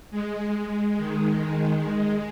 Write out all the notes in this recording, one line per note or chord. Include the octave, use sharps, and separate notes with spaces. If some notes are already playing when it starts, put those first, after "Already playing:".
G#3
G#3
D#3
G#3
G#3
G#3